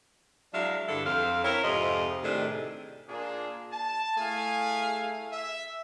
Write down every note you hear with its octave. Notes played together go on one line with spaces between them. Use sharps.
F#3 G#3 D4 E4 E5 F5
G2 D3 E4 A4
F2 C4 F5
E4 A#4 C#5
F2 G#2 C3 F3 G4 D#5
A2 C3 D#3 D4 G#4 A4
A#2 A#3 D4 G#4
A5
A3 E4 G#4 F5 G#5
E5